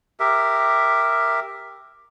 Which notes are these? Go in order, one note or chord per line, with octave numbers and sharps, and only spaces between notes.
G4 A#4 E5